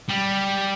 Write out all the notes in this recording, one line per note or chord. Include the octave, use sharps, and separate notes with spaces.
G3